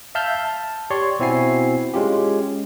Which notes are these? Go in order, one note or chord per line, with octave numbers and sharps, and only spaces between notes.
E5 F5 A5 E6 F6 G6
A5
G4 C#5 D5 C6 C#6
B2 C4 E4 F#4 G#5 C7
G#3 C#4 F4 G4